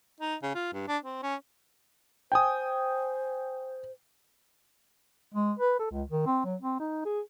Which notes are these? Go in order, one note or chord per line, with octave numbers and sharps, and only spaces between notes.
D#4
C#3
F4
G2
D4
C4
C#4
C5 G5 G#5 D#6
G#3
B4
A4
C#2
D#3
C4
F#3
C4
D#4
G#4